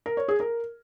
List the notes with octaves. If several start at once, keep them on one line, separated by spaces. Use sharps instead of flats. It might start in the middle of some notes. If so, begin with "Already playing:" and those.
A#4
C#5
G#4
A#4